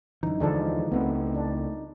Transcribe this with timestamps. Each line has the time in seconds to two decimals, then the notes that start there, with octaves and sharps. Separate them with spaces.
0.23 F#2 D3 E3 D#4
0.40 D#2 D3 E3 F3 G#3 D4 A4
0.92 C#2 G#3 A3 B3 C4
1.34 D4